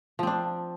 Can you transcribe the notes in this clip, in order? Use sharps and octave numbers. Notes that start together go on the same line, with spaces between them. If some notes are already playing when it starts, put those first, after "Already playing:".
F3 C4 D4